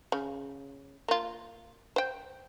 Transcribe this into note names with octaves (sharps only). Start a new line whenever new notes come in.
C#3
A#3 F4
C5 G5